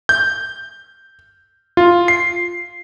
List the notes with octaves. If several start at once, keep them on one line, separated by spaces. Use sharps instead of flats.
G6
F4
C7